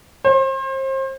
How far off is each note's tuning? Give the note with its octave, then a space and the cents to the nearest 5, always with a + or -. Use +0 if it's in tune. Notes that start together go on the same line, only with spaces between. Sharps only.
C5 +35